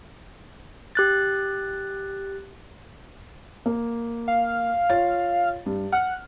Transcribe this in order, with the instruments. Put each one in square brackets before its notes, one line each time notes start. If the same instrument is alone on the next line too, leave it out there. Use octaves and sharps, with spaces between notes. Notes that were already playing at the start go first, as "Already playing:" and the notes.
[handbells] G4 F#6 A6
[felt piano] A#3
[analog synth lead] F5
[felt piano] F4 C#5 A6
G2
[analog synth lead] F#5 [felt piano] F6